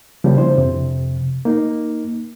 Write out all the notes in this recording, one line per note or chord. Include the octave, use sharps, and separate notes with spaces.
C#3 F3 G3 A#3
D4 E4 C5
F2 C3
A#3 D#4